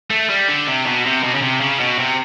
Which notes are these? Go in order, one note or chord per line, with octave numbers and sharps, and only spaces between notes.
A3
G3
D3
C3
B2
C3
B2
C#3
C3
C#3
B2
C3